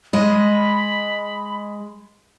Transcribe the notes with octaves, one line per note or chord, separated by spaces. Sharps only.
G#3 D#5 B5